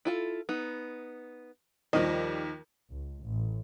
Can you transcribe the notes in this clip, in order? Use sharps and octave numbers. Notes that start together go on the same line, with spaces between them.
E4 F4 A4
B3 D#4
D#2 D#3 F3 G3 D#5
C#2
A1